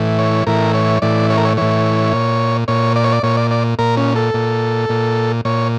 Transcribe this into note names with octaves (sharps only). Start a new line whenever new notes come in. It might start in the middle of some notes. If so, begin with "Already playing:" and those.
Already playing: A2 E3
C#5
A2 E3 A#4
C#5
A2 E3 D5
C#5
A#4
C#5
A2 E3 C#5
A#2
A#2 C#5
D5
C#5
D5
A#2 C#5
D5
D5
A#2 A#4
C#4
A4
A#2
A#2
A#2 C#5